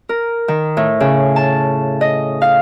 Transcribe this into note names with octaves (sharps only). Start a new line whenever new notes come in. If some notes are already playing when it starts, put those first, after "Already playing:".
A#4
D#3
A2
C#3
A5
D#5
F5